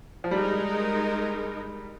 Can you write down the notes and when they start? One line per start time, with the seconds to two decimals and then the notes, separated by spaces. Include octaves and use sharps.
0.24 F3
0.31 G3 G#3 D#4 A#4